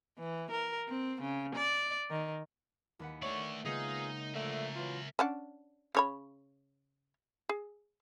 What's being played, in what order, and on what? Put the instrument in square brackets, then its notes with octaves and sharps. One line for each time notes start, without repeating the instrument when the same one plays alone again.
[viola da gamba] E3
A#4
C4
C#3
D5
D#3
[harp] D#2 B4 F#5
[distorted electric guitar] A3 D5 [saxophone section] C#5 [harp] E5
[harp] C#3 G#3 A#3 [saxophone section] B3 F4 G#4 [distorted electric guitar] D#4
[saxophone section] D3 F3 A3 [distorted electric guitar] A#4 E5
[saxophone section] E3 F#3 F4
[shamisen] C#4 D4 F#5
C#3 C#5 B5
G#4